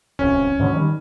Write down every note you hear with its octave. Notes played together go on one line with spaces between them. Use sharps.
D1 C2 C#4
G#2 D3 F#3
D#3 F#3 G3